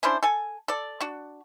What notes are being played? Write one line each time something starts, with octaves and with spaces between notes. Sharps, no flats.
C#4 D4 E4 C5
A4 G#5
A4 D5
D4 F#4